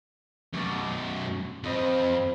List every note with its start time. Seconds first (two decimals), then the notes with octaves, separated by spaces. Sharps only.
0.54 F#2 B2 C#6 D6 A6
1.64 F2 C5 D#5 B5